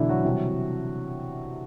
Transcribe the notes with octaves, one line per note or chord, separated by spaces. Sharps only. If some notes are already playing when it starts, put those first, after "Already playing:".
Already playing: B2 D3 E3 A3 D4 E4
F#3 F#4
C3 E3 G3